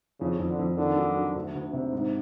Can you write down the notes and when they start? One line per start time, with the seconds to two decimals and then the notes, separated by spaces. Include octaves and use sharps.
0.20 F2 C#3
0.39 F2
0.49 D3
0.59 F2
0.77 D3 D#3
0.97 F#3
1.15 F#3
1.36 D2
1.54 D2
1.73 C3
1.93 G#2